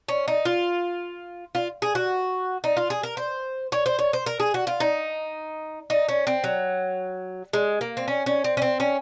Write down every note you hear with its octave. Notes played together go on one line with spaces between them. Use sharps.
C#4
D#4
F4
F4
G#4
F#4
D#4
F4
G#4
A#4
C5
C#5
C5
C#5
C5
A#4
G#4
F#4
F4
D#4
D#4
C#4
C4
F#3
G#3
A#3
C4
C#4
C#4
C4
C#4
C4
C#4